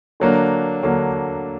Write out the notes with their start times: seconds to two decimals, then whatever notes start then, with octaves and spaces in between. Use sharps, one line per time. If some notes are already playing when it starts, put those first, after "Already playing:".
0.20 D3 F#3 A#3 D4
0.83 D3 F#3 A#3 D4